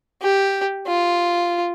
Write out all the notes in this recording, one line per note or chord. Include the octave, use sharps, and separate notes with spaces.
G4
F4